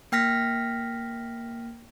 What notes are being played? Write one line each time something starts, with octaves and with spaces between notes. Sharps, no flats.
A#3 G5 F6 A#6 B6